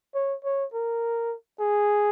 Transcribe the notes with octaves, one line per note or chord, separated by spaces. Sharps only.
C#5
C#5
A#4
G#4